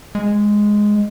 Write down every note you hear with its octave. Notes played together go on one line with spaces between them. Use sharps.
G#3